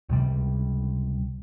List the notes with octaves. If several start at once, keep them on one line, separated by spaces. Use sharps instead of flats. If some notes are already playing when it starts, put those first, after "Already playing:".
C#2 C3 G3